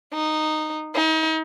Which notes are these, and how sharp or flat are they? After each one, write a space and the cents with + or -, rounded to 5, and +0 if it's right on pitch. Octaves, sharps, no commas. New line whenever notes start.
D#4 -10
D#4 +35